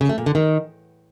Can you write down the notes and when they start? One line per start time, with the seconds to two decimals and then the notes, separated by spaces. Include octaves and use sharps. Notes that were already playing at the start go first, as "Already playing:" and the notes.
0.01 C#3
0.09 A3
0.18 A#2
0.26 D3
0.35 D#3